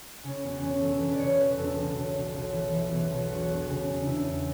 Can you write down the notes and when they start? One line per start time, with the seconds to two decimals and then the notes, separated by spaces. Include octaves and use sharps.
0.23 C#3 C#4
0.43 E1 B3
0.62 E1 C#4
0.81 E1 A4
1.00 E1 B4
1.15 C#3 C#5 D5
1.38 E1 B4
1.57 E1 A4
1.77 B1
1.96 B1
2.15 B1
2.35 B1
2.53 E3
2.72 E3
2.91 B1
3.11 B1
3.30 E1 F#4
3.49 E1
3.67 C#3
3.87 E2
4.02 C#3 D4 E4
4.25 E2